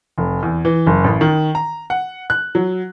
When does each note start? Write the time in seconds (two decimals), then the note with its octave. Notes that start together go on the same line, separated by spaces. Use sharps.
0.18 F1
0.43 E2
0.65 E3
0.87 F#1
1.04 A1
1.21 D#3
1.55 A#5
1.90 F#5
2.30 F#6
2.55 F#3